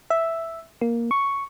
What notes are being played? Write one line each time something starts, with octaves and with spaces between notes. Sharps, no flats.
E5
A#3
C#6